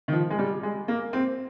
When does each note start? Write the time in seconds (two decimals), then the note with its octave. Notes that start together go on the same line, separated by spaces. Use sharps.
0.08 D#3
0.13 F3
0.30 G#3
0.39 G3
0.63 G#3
0.88 A#3
1.13 C4